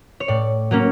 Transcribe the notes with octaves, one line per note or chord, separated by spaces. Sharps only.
C#5
A2 D5
F#3 A#3 C#4